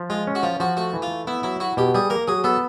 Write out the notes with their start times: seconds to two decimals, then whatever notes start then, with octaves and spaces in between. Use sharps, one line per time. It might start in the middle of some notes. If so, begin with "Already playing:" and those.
Already playing: F3
0.10 G#3 F4
0.27 C#4
0.35 F#4
0.43 F3 F4
0.60 F3 F#4
0.77 A3 F#4
0.94 E3
1.02 F4
1.10 A3
1.27 B3 E4
1.43 F#3 E4
1.60 E4 F#4
1.77 B2 G4
1.94 G3 G#4
2.10 A#3 A#4
2.28 F#3 G#4
2.44 B3 A4